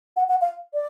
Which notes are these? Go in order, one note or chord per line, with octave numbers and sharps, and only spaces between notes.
F#5
F#5
F5
D5